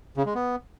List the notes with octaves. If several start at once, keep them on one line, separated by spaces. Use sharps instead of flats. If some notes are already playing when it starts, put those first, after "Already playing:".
C#3
G#3
B3